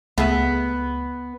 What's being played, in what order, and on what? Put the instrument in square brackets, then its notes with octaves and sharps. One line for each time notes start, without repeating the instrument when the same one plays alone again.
[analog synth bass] C#2 [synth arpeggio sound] A3 G#4 E5 [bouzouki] B3